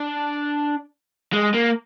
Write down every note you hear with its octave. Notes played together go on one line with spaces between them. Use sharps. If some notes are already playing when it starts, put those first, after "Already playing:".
Already playing: D4
G#3
A#3